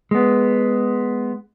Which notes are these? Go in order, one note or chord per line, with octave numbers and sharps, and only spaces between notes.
G#3 B3